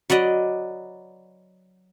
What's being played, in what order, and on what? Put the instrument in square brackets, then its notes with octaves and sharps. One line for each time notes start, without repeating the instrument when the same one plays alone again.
[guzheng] F#3 B4 D5 D#5